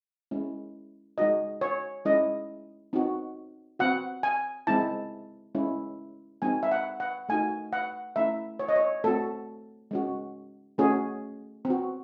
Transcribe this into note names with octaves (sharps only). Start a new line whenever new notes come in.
G#3 C#4 E4
G#3 D#4 F#4 D#5
C#5
G#3 C#4 E4 D#5
C4 D#4 F#4
C4 F#4 F#5
G#5
G#3 C4 E4 A5
G#3 C#4 E4
G#3 C4 D#4 F#4 G#5
E5
F#5
F#5
A3 D#4 F#4 G#5
F#5
A3 C#4 E4 E5
C#5
D#5
C#5
A3 C4 F#4 A4
G#3 C#4 F#4
A3 C#4 F#4 G#4
C4
F#4